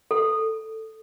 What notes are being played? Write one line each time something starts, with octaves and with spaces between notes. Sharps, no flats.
A4